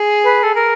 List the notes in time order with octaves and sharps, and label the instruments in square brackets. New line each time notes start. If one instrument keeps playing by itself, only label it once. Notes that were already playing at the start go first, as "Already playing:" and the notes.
Already playing: [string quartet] G#4
[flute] B4
A4
A#4